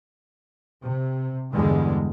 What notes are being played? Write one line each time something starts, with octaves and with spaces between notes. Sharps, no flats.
C3
E2 G2 D3 G3 G#3